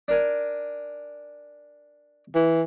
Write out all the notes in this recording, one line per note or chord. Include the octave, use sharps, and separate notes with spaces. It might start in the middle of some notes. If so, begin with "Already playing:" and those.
D4 A#4 G#5
E3